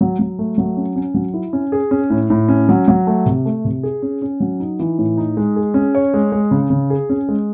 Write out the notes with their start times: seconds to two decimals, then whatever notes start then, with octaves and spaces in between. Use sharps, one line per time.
0.01 F#3
0.19 F#3
0.39 A3
0.58 F#3
0.77 C#4
0.96 C#4
1.14 F#3
1.34 E4
1.53 C#4
1.72 G#4
1.91 C#4
2.10 A2
2.30 A2
2.49 C#4
2.69 F#3
2.88 F#3
3.07 A3
3.26 C3
3.45 A3
3.65 C3
3.83 G#4
4.02 C#4
4.22 C#4
4.40 F#3
4.60 D#4
4.80 E3
4.98 A2
5.17 D#4
5.37 G#3
5.56 G#4
5.74 C#4
5.95 C#5
6.14 G#3
6.32 G#3
6.51 C#3
6.70 C#3
6.90 G#4
7.10 C#4
7.29 G#3